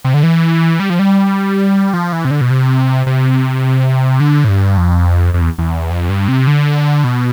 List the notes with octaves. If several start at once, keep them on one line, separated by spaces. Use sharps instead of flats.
C3
D3
E3
G3
F3
G3
F3
E3
C3
D3
B2
C3
C3
D3
A2
G2
F2
F2
E2
E2
F2
G2
C3
D3
B2